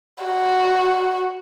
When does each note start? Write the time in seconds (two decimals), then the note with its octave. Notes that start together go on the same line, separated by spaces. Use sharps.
0.24 F#4